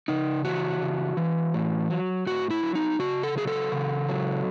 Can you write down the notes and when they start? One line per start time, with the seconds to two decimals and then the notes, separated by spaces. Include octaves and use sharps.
0.08 C#3 D#4
0.45 E3 F#4
0.81 C#3
1.17 E3
1.54 A2
1.90 F#3
2.27 A2 F#4
2.51 E4
2.63 F#3
2.75 D#4
2.99 C#3 F#4
3.23 A4
3.36 F#3 G#4
3.47 A4
3.72 C#3
4.08 F#3